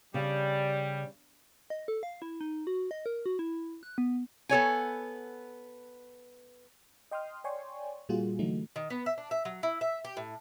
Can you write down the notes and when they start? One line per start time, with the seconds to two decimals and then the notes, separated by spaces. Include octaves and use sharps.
0.14 C#3 G3
1.70 D#5
1.88 A4
2.03 F5
2.22 E4
2.41 D#4
2.67 F#4
2.91 D#5
3.06 A#4
3.26 F#4
3.39 E4
3.83 F#6
3.98 B3
4.49 B3 A4 C#5 G#5
7.11 D#5 G5 C6 D#6 F6
7.44 C#5 D5 G5 G#5 C6 C#6
8.09 A#2 G3 A#3 F4 F#4 G#4
8.39 D3 E3 F#3 A3 D#4
8.76 D#3
8.90 B3
9.06 E5
9.18 D4
9.31 E5
9.45 F#3
9.63 E4
9.81 E5
10.05 G4
10.17 A2